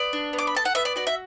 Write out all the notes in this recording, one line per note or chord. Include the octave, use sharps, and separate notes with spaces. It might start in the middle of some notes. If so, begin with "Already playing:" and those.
Already playing: B3 D5
D4
B3
D6
B5
A4 A5
F#5
B3 E5
D5
F#4 D5
E5